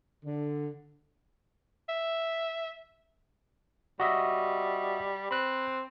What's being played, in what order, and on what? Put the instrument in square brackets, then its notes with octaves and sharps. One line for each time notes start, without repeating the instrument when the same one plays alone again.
[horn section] D3
[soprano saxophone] E5
[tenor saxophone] G3 [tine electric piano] F#4 D#5 E5
[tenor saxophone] C4 [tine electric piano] B5 F#6